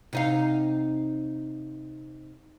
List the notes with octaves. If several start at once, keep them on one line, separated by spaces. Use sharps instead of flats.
C3 D#4 F5